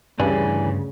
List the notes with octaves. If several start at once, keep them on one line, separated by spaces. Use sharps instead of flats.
D2 G2 C#3 E3 D5 G#5